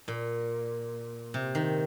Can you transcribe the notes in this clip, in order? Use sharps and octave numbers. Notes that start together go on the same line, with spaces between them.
A#2
C3
D#3